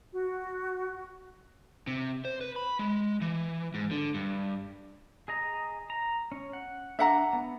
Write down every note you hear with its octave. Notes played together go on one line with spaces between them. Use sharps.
F#4
C3
C5
B4
B5
G#3
E3
G#2
D3
G2
G#4 D#5 A#5
A#5
C#4
F#5
D4 E5 F#5 A#5
B3